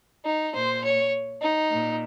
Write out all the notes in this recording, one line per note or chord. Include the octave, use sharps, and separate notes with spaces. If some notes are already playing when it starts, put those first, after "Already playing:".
D#4
A#2 C5
C#5
D#4
A#2